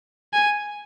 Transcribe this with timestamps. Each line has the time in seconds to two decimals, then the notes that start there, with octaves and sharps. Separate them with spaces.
0.33 G#5